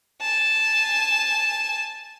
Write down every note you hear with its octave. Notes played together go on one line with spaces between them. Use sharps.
G#5 A5